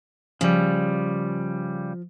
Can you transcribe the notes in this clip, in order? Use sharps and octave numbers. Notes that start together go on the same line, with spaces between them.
C#3 F3 G3